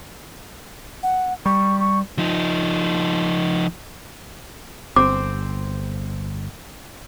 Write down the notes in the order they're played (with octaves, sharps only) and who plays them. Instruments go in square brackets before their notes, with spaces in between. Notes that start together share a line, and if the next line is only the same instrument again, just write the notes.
[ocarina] F#5
[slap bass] G3 [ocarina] C#6
[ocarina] C#6
[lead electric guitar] F3 D#4
[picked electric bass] G1 [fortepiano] C4 [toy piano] D6